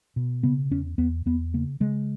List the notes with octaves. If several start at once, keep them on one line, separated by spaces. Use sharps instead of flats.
B2
C#3 B3
E2 C#4
E2 B3
E2 B3
C#3 A#3
C#3 G#3